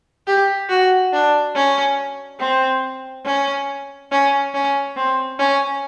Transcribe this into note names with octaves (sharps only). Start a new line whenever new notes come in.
G4
F#4
D4
C#4
C4
C#4
C#4
C#4
C4
C#4